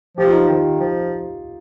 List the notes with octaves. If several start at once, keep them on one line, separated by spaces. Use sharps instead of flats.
F3 G4
F4
D#4 G4
D#3
F3